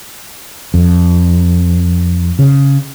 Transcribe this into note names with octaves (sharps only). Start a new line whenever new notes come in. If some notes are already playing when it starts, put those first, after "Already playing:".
F2
C#3